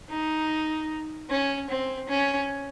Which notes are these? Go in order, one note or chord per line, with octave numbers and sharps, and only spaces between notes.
D#4
C#4
C4
C#4